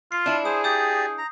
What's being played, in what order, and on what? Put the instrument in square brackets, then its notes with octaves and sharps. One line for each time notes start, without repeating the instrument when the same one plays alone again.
[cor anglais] F4 [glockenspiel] C7
[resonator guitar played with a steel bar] D4 E4
[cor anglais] G#4 [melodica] C5 [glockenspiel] D#6
[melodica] G4 D5 [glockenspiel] D#6 G6
[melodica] A#5